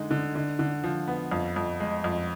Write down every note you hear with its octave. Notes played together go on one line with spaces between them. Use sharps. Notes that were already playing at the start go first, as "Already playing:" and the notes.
Already playing: D3 G#3 D#4
D3
D3
D3
F3
B3
F2
F2
G#3
F2